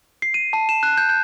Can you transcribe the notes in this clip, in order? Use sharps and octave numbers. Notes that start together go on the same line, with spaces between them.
C7
D#7
A5
E7
F#6
G6
G6